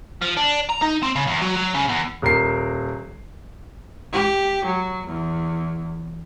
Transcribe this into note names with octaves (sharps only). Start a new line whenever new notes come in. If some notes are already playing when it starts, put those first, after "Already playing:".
F3
D4
A#5
D#4
C4
C#3
E2
F#3
F#3
C#3
E2
D#1 A#4 C7
G4
F#3
E2